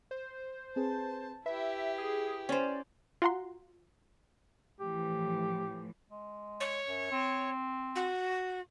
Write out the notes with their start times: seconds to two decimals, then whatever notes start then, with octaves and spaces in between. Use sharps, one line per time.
0.11 C5
0.76 C4 G#4 B4 A5
1.46 E4 G4 B4 E5
1.98 G#4
2.49 C#4 C5 D5
3.22 F4 F#4 F#5 A#5 C6
4.80 A2 E3 F3 G4
6.10 G#3
6.60 C#5
6.88 F#2
7.11 C4
7.95 F#4